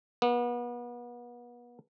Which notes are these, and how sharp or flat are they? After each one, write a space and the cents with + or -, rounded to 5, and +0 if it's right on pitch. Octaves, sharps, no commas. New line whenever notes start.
B3 -35